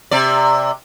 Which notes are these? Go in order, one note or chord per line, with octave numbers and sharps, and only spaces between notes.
C3 D5